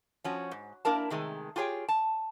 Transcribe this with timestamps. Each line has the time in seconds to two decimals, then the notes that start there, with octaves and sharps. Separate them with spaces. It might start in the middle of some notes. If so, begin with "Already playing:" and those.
0.24 F3 C#4 F#4
0.51 G#2
0.85 A#3 D4 E4 A#4 A5
1.10 C3 D#3 G#3 A3
1.56 F4 G4 G#4 C#5 G5
1.89 A5